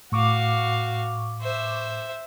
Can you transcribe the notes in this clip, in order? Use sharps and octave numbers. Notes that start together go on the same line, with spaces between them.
A2 F#4 F5 C#6 D6
C5 E5